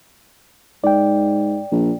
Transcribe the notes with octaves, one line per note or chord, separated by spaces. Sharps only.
G#2 D5 G5
A#1